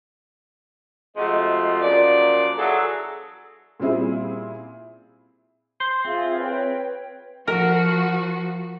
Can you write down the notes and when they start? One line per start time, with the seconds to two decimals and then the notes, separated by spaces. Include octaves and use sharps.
1.17 C3 F3 G#3 A3 F#4 D#5
1.82 F#2 A#2 F3 D5
2.58 E3 F#3 G#4 A4
3.80 A#2 G3 C4 E4 G#4
5.80 C5
6.05 C4 F4 G#4 E5
6.38 B4 C#5 G5
7.47 F3 F#4 A#4